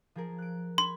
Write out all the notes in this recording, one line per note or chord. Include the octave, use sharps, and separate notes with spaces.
F3 G#4 A#4
F#6 D7
B5 C6 G#6